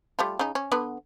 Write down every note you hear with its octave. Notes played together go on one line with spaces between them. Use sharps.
G3 A3 F4
C#3 D#4
C#4
D3 B3 B4